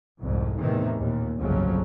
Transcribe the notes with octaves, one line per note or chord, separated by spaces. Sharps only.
C2 F2 G#2
E2 A2 C3 D#3 E3
D#2 A#2
G1 C2 F2 C#3 F3 F#3